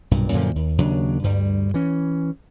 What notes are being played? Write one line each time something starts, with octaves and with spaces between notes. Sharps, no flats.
B1 G2 A#2
F#2 A#2 D3 F3
D#2
D#2 C#3 F#3 D4
D2 G2 G3
E3 C#4